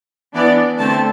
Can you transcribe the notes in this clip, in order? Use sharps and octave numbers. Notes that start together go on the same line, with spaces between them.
E3 B3 D4 D5
D3 A3 C4 A5